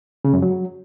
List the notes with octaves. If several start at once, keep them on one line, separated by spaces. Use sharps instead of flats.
C#3
F#2
F#3